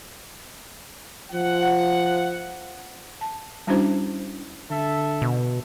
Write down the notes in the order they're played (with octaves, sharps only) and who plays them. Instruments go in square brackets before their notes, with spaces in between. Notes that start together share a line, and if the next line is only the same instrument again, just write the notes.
[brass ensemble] F3 F#5
[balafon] A5
G3 C#4 D4 E4 F#4 C5
[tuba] D3 [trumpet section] A4 E5
[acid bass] B2